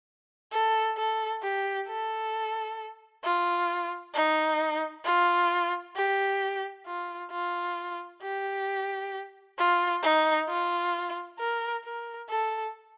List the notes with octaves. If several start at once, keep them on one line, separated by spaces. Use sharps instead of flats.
A4
A4
G4
A4
F4
D#4
F4
G4
F4
F4
G4
F4
D#4
F4
A#4
A#4
A4